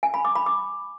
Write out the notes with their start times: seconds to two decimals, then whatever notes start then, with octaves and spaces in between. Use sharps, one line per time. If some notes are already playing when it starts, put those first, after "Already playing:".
0.03 G#5
0.14 B5
0.25 D6
0.35 B5
0.46 D6